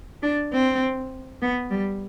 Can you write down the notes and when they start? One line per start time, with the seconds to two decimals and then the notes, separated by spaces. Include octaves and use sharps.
0.23 D4
0.53 C4
1.42 B3
1.71 G3